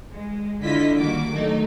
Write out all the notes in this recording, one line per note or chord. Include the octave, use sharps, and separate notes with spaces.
G#3
D3 E4 F4 D#5 B6
D#3 G3 A#3 F#4 D6
D#3 F#3 A3 D#4